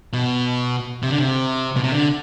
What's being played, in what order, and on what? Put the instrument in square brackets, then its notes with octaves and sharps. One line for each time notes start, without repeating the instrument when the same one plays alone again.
[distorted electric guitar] B2
C3
D3
C3
B2
C3
D3